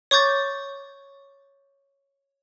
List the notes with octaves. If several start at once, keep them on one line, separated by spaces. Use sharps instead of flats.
C#5 C#6 D6 G6 A6